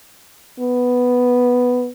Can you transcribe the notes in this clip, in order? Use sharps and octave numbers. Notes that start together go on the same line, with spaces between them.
B3